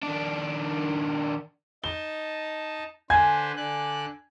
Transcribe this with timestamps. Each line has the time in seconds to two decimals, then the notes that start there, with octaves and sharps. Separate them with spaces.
0.03 D#3 D4
1.84 D#4 A5 G7
3.10 D3 B4 C5 G#5 G#6
3.57 D3 D5 F#6